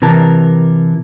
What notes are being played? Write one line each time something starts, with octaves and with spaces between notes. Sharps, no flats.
C3 E3 A#4 A5